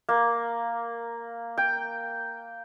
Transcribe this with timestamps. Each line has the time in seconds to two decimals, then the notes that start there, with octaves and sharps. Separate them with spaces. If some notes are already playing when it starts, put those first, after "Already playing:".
0.09 A#3
1.58 G5